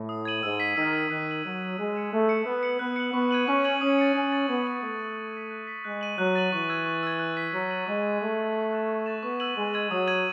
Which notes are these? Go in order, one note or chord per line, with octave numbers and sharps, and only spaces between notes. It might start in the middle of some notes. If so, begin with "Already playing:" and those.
Already playing: A2
D#6
G#6 D#7 F#7
G#2 E6
B6 D#7 F#7
D#3 E6
B6 D#7 F#7
D#3 F#6
B6 D#7 F#7
F#3 F#6
B6 D#7 F#7
G#3 F#6
C#7 E7
A3 F#6
C#7 E7
B3 F#6
C#7 F#7
B3 F#6
C#7 F#7
B3 C#6
G#6 D#7 F#7
C#4 C#6
G#6 D#7 F#7
C#4 D#6
A6 C#7
C#4 D#6
A6 C#7
B3 G#6
D#7 F#7
A3 G#6
D#7 F#7
F#6
B6 D#7
F#6
B6 D#7
G#3 F#6
A6 D#7 F#7
F#3 F#6
A6 D#7 F#7
E3 C#6
E6 G#6
C#6
E6 G#6
F#6
B6 D#7 F#7
F#3 F#6
B6 D#7 F#7
G#3 C#6
E6 A6
A3 C#6
E6 A6
C#6
F#6 A6 E7
C#6
F#6 A6 E7
B3 C#6
E6 G#6 D#7 F#7
G#3 C#6
E6 G#6 D#7 F#7
F#3 D#6
G#6 D#7 F#7